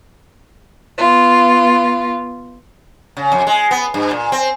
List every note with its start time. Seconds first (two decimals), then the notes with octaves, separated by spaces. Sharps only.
0.97 B3 F4
3.17 C#3
3.32 F2
3.47 G#3
3.71 B3
3.94 G2
4.11 A#2
4.32 C4